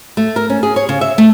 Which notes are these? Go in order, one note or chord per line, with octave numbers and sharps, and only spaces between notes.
A3
A#4
C#4
G#4
C#5
C#3
E5
A3